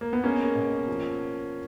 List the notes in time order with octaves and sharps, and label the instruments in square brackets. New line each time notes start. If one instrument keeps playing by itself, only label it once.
[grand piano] A#3
B3
G#3 A#3 C#4
B2
F3